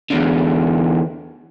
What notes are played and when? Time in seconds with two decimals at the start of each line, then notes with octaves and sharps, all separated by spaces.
0.11 E2 D3